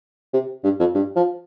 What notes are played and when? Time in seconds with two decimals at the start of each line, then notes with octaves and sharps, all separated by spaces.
0.34 C3
0.64 G2
0.80 F2
0.95 G2
1.16 F3